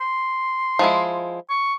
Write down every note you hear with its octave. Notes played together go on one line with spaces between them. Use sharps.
C6
F3 G#3 E4
C#6